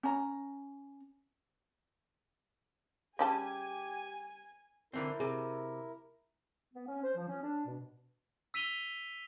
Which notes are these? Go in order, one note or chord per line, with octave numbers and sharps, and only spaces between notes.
C#4 A#5
C#3 G3 G4 G#5 A5
D3 E3 C4 E4 A#4
C3 G#4
B3
C#4
C5
F3
C#4
D4
B2
E6 B6 D#7 F7 G7